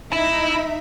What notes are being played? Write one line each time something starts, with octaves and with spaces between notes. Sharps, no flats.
D#4 E4 E5